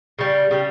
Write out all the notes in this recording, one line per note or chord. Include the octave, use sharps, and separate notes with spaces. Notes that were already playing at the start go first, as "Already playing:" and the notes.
C#3 G3
C#3 G3